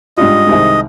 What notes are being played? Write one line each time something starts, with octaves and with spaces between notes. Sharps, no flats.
G#2 G3 D4 F4 D#5
C2 C3 D#3 G#3